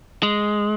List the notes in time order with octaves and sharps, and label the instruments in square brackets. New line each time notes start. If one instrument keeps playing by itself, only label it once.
[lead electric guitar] G#3